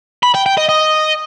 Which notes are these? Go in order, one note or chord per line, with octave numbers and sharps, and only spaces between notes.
B5
G5
G5
D#5
D#5